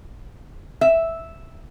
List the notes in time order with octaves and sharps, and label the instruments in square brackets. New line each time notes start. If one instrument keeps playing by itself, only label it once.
[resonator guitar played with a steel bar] E5